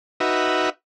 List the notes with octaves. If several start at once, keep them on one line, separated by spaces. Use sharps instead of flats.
D#4 F#4 B4 E5